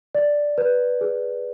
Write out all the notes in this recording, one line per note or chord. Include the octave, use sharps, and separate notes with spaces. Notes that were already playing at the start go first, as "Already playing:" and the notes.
D5
B4
G#4